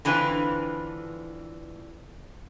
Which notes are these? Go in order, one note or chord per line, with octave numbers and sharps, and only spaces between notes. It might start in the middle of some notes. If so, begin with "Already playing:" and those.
D3 E3 C4 D4 F4 B4